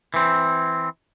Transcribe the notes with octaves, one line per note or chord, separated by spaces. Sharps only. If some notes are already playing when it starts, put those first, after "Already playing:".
E3 C4